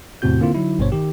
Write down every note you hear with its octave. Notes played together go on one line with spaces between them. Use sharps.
E2 A2 C3 C4 F#4 G6
D3 A#3 C4 E4 F4
D3 F#3 D#4 E4
G#1 G2 B2 B3 C5 C#5
D#3 D#4 G4